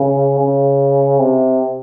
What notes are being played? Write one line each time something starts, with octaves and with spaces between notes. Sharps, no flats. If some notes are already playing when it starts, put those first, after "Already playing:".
Already playing: C#3
C#3
C3